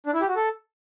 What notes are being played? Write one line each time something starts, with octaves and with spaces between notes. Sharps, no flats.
D4
E4
G4
F#4
A4